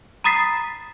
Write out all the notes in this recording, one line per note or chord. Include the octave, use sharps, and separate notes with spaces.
A#5 B5 D#6 A6 B6 C7